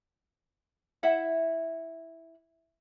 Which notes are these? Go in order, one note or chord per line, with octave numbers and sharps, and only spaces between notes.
E4 E5 F#5